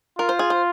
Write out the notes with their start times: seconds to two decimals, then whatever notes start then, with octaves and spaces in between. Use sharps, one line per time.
0.19 F4 A#4
0.29 C5
0.39 G#4
0.50 C5